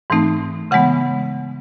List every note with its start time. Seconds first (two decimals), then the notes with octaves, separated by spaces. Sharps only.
0.10 G#2 E3 A3 C4 D#4
0.71 C#3 E3 G#3 B3 F#5